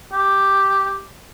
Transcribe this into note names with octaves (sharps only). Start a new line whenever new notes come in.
G4